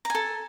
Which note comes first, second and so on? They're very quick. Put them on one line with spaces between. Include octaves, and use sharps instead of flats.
A#5 G#5 A4